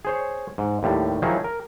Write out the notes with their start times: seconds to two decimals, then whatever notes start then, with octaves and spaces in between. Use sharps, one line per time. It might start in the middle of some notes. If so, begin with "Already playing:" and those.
0.05 G#4 C5 C#5
0.58 G#2
0.83 D#2 A2 G3
1.22 D#3 F3 F#3 D#4 E4 G#4
1.44 A#4